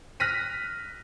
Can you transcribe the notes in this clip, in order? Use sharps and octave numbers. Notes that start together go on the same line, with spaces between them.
F6 F#6 A#6 B6 D#7